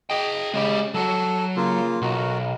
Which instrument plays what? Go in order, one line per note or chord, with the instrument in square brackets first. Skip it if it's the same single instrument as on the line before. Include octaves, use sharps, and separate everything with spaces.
[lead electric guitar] G#4 G5 [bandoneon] D#5
[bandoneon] C#3 [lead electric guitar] G#3 G4
[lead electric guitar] F#3 F#4 [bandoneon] A4
[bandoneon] C#3 A#3 F4
[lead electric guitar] B1 [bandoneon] F#4 A#4